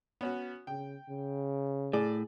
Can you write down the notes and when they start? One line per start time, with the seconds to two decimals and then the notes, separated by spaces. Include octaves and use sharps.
0.21 B3 C#4 F#4
0.67 C#3 G5
1.09 C#3
1.93 A2 G#4 D5